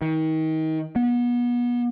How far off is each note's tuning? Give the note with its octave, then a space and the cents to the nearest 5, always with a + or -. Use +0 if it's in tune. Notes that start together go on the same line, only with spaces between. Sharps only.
D#3 +30
B3 -30